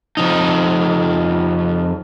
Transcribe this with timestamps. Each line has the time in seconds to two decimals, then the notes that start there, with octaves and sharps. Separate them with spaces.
0.17 F2 F3 D#4